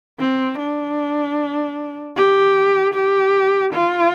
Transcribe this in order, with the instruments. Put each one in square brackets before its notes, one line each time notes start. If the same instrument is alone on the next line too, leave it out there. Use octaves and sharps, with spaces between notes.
[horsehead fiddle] C4
D4
G4
G4
F4